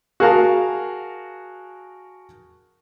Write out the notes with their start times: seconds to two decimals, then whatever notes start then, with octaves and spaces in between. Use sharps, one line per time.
0.20 F#4 G#4 A#4 F5 A5